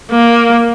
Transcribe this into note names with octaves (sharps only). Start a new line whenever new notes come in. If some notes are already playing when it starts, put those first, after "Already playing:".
A#3